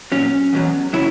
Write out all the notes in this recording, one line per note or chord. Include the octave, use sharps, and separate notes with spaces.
A#2 F#3 C#4
E2 B2 F#3
C#3 F#3 E4